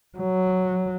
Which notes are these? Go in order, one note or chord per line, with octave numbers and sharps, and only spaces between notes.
F#3